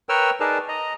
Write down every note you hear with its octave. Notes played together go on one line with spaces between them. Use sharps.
A#4 B4 C#5 G5 E6 F6
D#4 G#4 A#4 B4 D5 A5
D#5 A#5